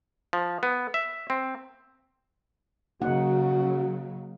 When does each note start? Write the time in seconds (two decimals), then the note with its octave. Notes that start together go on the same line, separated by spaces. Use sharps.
0.33 F3
0.63 B3
0.94 E5
1.30 C4
3.02 C#3 F#3 A#3 D#4 F#4 F#5